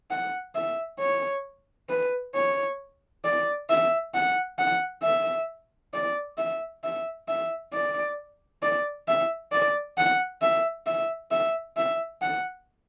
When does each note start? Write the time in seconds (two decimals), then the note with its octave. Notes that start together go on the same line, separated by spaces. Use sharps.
0.11 F#5
0.55 E5
0.99 C#5
1.89 B4
2.35 C#5
3.25 D5
3.70 E5
4.14 F#5
4.59 F#5
5.03 E5
5.94 D5
6.38 E5
6.84 E5
7.28 E5
7.73 D5
8.63 D5
9.08 E5
9.53 D5
9.97 F#5
10.42 E5
10.87 E5
11.31 E5
11.77 E5
12.22 F#5